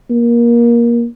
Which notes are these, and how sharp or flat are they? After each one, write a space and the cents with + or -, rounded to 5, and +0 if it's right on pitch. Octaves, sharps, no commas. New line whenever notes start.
A#3 +20